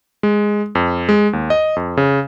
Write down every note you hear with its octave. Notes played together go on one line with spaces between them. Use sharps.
G#3
F2
G#3
D#2
D#5
F2
C#3